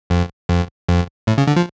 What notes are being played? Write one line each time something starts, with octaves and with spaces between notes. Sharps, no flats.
F2
F2
F2
A2
C#3
D3
F3